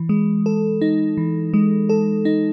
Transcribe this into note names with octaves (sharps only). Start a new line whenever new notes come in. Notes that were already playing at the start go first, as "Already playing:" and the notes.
Already playing: E3
G#3
A4
D#4
E3
G#3
A4
D#4